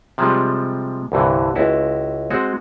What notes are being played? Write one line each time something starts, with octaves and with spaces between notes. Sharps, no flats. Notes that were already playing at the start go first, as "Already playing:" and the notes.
C3 F3 G3 G#3
C2 G2 D3 E3
C#2 E4 F#4
G#3 C4 F#4